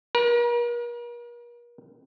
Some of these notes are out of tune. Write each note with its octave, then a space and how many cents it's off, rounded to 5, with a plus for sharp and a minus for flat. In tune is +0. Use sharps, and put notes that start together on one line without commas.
A#4 +40